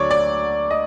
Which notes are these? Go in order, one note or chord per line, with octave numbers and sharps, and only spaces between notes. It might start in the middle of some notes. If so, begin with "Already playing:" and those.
Already playing: D2 D3 F#3 A3 C#5 D5
D5
D#5